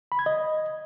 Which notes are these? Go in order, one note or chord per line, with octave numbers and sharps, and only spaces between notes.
B5
G#6
D#5